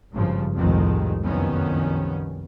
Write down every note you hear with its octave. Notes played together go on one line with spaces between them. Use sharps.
G#1 G2 C#3 F3
F1 C2 F2 A2 D#3 G#3
F#1 C2 F2 D#3 B3 C#4